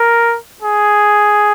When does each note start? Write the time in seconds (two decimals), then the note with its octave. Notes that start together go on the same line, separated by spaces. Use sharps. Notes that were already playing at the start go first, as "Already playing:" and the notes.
Already playing: A#4
0.62 G#4